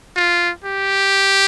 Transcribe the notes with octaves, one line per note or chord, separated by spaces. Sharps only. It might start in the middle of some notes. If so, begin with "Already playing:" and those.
F4
G4